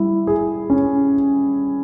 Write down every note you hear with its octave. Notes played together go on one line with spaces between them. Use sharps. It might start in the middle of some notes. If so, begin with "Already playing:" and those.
Already playing: G3 E4
G#4
C#4